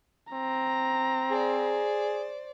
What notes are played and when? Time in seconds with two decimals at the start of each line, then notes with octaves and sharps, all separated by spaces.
0.32 C4 A#5
1.31 G#4 C5 D5